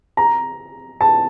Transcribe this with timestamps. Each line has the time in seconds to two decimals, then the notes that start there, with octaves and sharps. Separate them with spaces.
0.17 A#5
1.01 A5